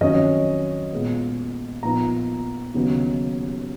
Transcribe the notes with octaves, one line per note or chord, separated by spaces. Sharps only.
F2 D#3 F#3 C#4 D#5
A#2 G#3 B3
A#2 F3 B3 D#4 A#5
D#2 C#3 F#3 B3 D#4